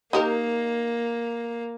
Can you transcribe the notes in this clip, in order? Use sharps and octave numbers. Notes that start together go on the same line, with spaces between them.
A#3 D#4 G4 A#4